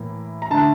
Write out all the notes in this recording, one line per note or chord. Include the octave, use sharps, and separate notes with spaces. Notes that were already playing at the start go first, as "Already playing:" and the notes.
Already playing: A2 E3 A#3
A#5
D3 A3 A5